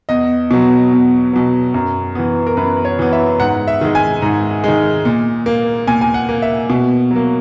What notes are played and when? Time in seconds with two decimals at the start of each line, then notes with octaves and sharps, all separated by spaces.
0.09 E2 D#5
0.51 B2 F#3
0.92 E2
1.33 B2 F#3
1.74 F#2
2.15 E3 B3
2.47 A#4
2.57 F#2 B4
2.85 C#5
2.99 E3 B3
3.13 E5
3.40 G#2 F#5
3.68 E5
3.81 D#3 G#3
3.95 G#5
4.22 G#2
4.64 D#3 G#3
5.05 A#2
5.46 A#3
5.87 A#2 G#5
6.01 G#5
6.14 F#5
6.29 A#3
6.42 E5
6.70 B2
7.11 F#3 A#3